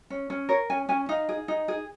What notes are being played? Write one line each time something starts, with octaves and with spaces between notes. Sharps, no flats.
C#4
C#4
A#4 C#5
C#4 G#5
C#4 G#5
D#4 F5
G#4
D#4
G#4